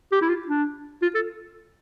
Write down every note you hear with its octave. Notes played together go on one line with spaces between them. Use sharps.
G4
E4
F4
D4
F4
A4